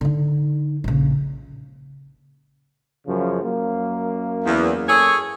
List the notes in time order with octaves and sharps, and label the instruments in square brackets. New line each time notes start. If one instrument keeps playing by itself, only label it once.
[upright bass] D3 D#4
A#1 C#3
[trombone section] F#2 C#3 F3
F#2 A#3
[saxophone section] E2
G#4 A4 C#5